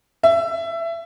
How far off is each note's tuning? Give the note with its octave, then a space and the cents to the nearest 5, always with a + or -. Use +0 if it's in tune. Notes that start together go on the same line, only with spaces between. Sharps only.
E5 +20